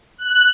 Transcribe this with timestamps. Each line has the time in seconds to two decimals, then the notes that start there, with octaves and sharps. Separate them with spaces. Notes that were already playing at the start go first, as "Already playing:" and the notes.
0.18 F#6